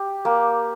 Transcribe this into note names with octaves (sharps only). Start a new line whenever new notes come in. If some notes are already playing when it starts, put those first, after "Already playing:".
Already playing: G4
A#3